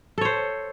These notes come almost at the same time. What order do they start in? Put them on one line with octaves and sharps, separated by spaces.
A4 C#5 C5